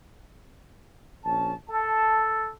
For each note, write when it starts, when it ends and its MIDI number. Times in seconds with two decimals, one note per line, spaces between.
1.25 1.54 34
1.25 1.54 61
1.25 1.54 81
1.70 2.52 69
1.70 2.25 81